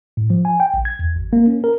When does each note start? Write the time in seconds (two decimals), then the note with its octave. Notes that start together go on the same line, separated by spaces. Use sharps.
0.17 A2
0.30 F3
0.45 G#5
0.60 G5
0.74 A#1
0.85 G#6
0.99 E2
1.16 G#1
1.33 A#3
1.47 C#4
1.64 A#4